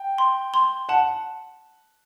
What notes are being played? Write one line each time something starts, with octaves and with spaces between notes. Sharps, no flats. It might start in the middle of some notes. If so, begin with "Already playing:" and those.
Already playing: G5
C6
C6
F#5 A5